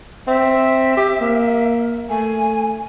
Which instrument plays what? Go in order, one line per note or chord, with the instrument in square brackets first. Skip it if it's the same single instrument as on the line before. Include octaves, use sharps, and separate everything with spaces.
[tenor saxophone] C4 [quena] E5
[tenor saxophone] G4
A#3
[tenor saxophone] A3 [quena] G#5